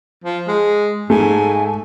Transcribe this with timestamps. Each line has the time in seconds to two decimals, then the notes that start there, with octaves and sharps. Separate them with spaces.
0.25 F3
0.48 G#3
1.10 G#2 A3 G#5